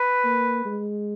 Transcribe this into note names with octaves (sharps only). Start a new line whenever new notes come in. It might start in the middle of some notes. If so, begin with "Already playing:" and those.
Already playing: B4
A#3
G#3